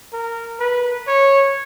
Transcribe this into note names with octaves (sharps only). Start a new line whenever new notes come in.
A#4
B4
C#5